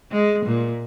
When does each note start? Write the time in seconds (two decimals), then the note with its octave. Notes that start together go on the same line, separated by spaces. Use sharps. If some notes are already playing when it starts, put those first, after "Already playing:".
0.11 G#3
0.46 A#2